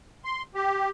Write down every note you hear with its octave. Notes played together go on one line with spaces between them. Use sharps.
C6
G4